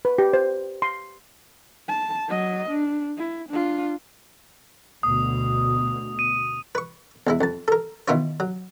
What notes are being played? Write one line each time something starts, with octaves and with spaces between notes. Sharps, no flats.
B4
G4
C5
C6
A5
F#3 D#5
D4
E4
D4 F4
D2 B2 D#6
D#7
B4 C#6
E2 G#3 E4
F2 A5
A4 A#4
B2 D#3 E4 F4 C#5
F#3